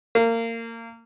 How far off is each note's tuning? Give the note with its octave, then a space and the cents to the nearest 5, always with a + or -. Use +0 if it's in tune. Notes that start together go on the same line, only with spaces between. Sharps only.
A#3 -25